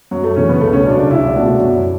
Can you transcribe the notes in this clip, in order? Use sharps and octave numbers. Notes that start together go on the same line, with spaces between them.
F#2 F#3
A3
C#3 E3 C#4
B3
C#2 A3
C#4
C#3 F#3 D4
D4
C#2 E4
B2 A3 D4 F#4
F#2